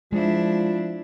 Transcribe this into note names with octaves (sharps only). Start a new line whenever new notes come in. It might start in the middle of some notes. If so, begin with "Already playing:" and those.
F3 G#3 D4 E4